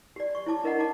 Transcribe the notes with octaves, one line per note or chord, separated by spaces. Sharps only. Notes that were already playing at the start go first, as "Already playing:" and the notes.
G4 D5
C#6
E4 C#5 A5 D6
D4 A#4 D#5 E5 F#5 A#5
D#4 E4 A5 D6